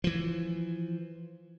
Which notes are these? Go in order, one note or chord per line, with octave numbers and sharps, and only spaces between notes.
E3 F3